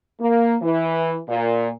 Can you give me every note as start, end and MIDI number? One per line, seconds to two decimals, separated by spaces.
0.21 0.56 58
0.62 1.17 52
1.29 1.70 46